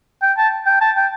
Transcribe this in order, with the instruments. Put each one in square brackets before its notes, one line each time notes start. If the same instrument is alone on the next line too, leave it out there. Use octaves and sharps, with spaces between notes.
[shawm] G5
A5
G5
A5
G5